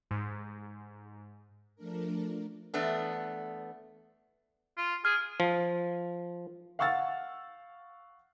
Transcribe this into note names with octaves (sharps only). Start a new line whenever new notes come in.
G#2
F3 A3 D4 A#4
E2 A3 B3 D4
F4
G#4 F6
F3
F5 F#5 C#6 E6 F6 A6